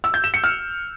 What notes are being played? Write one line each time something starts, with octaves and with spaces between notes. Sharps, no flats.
E6
G6
E7
C#7
F6